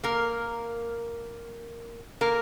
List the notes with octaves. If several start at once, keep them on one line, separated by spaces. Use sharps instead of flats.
A#3 A#4
A#3 A#4